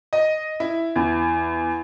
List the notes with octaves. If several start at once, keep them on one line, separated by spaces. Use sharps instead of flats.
D#5
E4
E2